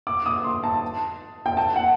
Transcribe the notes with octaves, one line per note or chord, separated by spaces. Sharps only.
D6
D#6
C6
A5
G5
A5
F#5